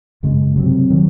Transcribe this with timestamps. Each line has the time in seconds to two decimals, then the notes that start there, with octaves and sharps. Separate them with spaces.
0.23 F#2 C#3 G#3
0.56 C3 F#3 C4
0.90 D#3 F#3